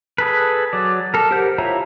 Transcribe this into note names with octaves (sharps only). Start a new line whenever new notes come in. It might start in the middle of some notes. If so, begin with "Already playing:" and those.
G#4 A4 B4
F#3 D5
A4 A#4
G4 A#4 C5 F#5 G6
E4 F4 C#5 E5 A#5